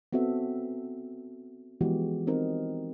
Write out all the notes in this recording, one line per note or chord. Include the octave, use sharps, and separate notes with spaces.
B3 C4 F#4 A4 E5
E3 F3 G#3 B3 F#4 G4
C4 D#4 A#4